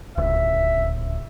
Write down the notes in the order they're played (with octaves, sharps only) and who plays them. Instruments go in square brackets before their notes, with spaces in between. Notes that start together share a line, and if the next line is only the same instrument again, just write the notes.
[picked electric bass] D1 C#2 [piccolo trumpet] E5